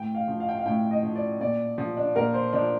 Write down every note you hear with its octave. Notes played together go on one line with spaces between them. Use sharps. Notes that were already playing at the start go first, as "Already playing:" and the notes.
Already playing: A2 G5
F5
F3
F5
G5
F5
A2 G5
D#5
F3
D5
A#2 D5
F3
D4
A#2 A#4
C5
F3 D4